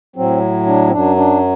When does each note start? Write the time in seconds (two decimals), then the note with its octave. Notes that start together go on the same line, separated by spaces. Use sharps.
0.16 A2 F#3 C4
0.66 D4
0.87 C4
0.92 F#2 F#3 D4
1.16 D4